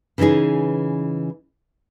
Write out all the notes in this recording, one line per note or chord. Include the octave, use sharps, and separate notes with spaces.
C#3 E3 C#4 D#4 G#4